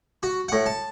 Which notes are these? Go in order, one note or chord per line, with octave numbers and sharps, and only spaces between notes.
F#4
A2 F#5
A5